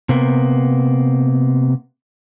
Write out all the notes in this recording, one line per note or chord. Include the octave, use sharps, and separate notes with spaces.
C3 A#3 B3